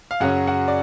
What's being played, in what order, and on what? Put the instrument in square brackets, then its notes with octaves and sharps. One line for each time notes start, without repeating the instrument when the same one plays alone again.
[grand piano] F5
F#2 C#3 F#3 C#4 F#4 F#5
F#4 F#5
D5